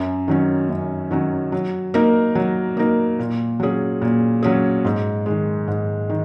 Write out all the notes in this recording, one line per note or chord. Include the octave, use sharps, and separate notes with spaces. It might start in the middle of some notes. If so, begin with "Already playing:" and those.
Already playing: F#2
D#3 F#3 C#4
F#2
D#3 F#3 C#4
F#3
A#3 D#4 A#4
F#3
A#3 D#4 A#4
A#2
F#3 C#4 G#4
A#2
F#3 C#4 G#4
G#2
D#3 G#3
G#2
D#3